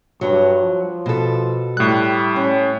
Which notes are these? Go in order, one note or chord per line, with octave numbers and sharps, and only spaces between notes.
G2 F#3
F3
B2 A4
A2 G3 F#6
C#4